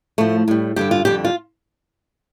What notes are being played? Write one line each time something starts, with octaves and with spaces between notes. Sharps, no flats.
A2 F3 A3
A2 G3
G2 D3 G3 G4
F4
F2 D3 G3 G4
F4